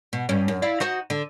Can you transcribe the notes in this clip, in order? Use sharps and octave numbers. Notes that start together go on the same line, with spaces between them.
B2
G2 C#4
F#2
E4 D5 F5
D#4 F#4 C5
D3